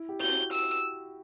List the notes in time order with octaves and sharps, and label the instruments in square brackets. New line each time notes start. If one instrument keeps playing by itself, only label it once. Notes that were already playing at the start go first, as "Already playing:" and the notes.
Already playing: [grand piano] E4
G4
[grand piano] F#4 [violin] G6
[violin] E6